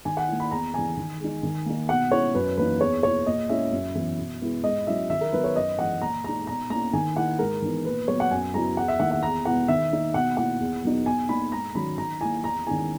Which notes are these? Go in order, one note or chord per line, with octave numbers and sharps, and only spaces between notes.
D#3 G#5
F#5
A#3 E4
B5
E2 A#5
C#3 E3 G#5
D#3
G#3 D#4
D#3
A#3 D#4
B2 F#5
G#3 C#4 E4 C#5
F#2 B4
E3 A#3 D#4 B4
E2 C#5
B2 A#3 E4 C#5
A#2 D#5
G#3 C#4 E4 E5
F#2
E3 B3 E4
B2
G#3 B3 E4
G#2 D#5
F#3 C#4 E4 E5
D#3 E5
A#4
F#3 B3 D#4 B4
C#5
F#2 D#5
E3 G#3 F#5
A#2 A#5
G#3 D#4 A#5
B2 A#5
A#3 C#4 E4 A#5
D#3 G#5
A#3 E4 F#5
G#2 A#4
E3 B3 D#4
A#2 B4
F#3 B3 C#5
F#5
F#2 G#5
C#3 F#3 B3 E4 A#5
E2 F#5
E5
D#3 A#3 E4 F#5
F#5
E2 A#5
B2 G#3 B3 E4 F#5
D#3 E5
A#3 D#4
B2 F#5
A#3 E4 F#5
E2
B2 F#3 B3 D#4
B2 G#5
A#3 D#4 B5
G#2 A#5
D#3 F#3 C#4 B5
D#3 A#5
A#3 E4 G#5
E2 A#5
D#3 G#3 C#4 E4 G#5